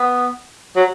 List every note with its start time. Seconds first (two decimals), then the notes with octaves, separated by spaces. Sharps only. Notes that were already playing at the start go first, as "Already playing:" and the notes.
Already playing: B3
0.76 F#3